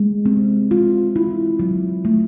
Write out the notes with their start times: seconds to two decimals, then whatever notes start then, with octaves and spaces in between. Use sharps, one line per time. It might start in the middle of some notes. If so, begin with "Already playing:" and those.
Already playing: G#3
0.26 C4
0.71 F4
1.16 E4
1.60 F#3
2.05 A3